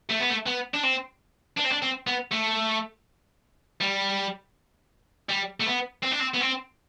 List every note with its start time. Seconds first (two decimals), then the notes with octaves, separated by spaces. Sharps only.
0.10 A3
0.20 B3
0.30 A3
0.47 B3
0.74 D4
0.83 C4
1.58 D4
1.64 C4
1.72 D4
1.82 C4
2.07 B3
2.32 A3
3.81 G3
5.29 G3
5.60 A3
5.66 B3
6.03 C4
6.12 D4
6.20 C4
6.34 B3
6.41 C4